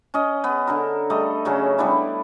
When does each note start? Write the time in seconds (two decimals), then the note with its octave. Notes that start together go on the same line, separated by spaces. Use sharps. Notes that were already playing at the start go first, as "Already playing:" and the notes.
0.14 C#4 D#5
0.44 B3
0.67 D3 A4 A#4
1.10 G3 A3 D#5
1.45 C#3 F#3 C#4
1.78 G3 B3 D4 E4